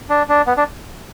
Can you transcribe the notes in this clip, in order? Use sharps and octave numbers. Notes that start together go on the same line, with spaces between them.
D4
D4
B3
D4